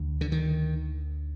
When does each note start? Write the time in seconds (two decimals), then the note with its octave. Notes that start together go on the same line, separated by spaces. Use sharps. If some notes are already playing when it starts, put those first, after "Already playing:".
Already playing: D2
0.21 D3
0.32 D#3